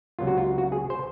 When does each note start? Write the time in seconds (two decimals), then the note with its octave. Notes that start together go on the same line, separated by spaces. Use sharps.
0.19 C#2 C3 F#3 A#3 F4
0.27 F#4
0.38 F4
0.58 F#4
0.72 G#4
0.90 C5